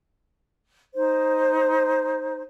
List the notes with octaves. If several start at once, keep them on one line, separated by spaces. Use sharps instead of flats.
D#4 C5